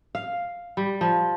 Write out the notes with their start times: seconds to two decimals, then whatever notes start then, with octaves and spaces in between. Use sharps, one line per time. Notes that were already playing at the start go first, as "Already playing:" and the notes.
0.15 F5
0.77 G3
1.01 F3